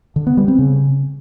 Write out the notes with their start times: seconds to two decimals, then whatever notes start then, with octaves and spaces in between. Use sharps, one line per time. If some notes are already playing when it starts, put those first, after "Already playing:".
0.16 D3
0.27 B3
0.37 G3
0.48 C4
0.59 C#3